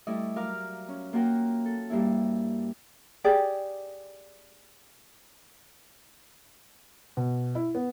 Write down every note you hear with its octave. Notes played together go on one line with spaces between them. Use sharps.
G3 A3 E4 D5 D#5
F#3 A#4 F5 D6 F6
C#4
A#3 F4 F#4 A#4 F#5 G5
A4
G2 G3 A#3 E4
G4 G#4 D5
B2
E4
B3